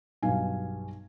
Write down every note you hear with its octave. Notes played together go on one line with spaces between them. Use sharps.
B1 G2 F5 G#5